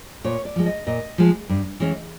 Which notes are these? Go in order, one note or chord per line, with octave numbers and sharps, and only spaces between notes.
A#2 C#5
D5
F3 G#3
D#5
A#2 D#5
F3 G#3
G2
E3 G#3 C#4